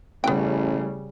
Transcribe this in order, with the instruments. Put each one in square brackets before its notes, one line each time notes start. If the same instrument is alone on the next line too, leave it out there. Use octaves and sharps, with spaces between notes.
[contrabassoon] A1 [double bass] C#3 G3 [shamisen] B3 G5